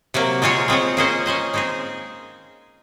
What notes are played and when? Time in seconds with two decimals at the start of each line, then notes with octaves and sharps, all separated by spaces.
0.14 C3 F#3 A#3
0.42 G#3 C4 F4 G#4 C#5
0.68 G#3 C4 F4 G#4 C#5
0.97 A#3 C#4 G#4 C5 D#5
1.26 A#3 C#4 G#4 C5 D#5
1.54 G#3 C4 D#4 G#4